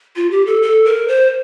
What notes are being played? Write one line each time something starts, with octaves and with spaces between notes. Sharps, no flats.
F4
G4
A4
A4
A#4
C5